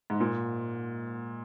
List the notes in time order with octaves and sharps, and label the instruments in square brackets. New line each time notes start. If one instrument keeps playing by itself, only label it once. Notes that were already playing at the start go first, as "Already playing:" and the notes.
[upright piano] G#2
A#2